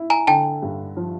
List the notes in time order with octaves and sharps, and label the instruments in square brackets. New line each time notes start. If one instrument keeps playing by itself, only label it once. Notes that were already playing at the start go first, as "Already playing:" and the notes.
Already playing: [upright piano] E4
[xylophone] G#5 A#5
[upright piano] D3 [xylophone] G5 A5
[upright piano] G2
F3